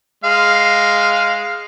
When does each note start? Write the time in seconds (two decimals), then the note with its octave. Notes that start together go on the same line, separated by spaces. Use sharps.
0.24 G#3 F5